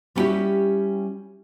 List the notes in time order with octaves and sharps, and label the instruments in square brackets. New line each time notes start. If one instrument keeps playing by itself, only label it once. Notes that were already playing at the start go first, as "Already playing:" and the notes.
[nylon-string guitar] G3 B3 C#4 E4 F#4 G4